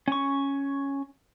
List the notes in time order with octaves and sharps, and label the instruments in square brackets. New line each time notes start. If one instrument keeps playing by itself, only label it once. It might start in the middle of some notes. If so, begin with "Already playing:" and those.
[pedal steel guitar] C#4 C#6